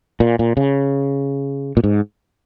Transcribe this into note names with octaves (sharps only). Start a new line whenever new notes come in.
A#2
A#2
C#3
A#2
G#2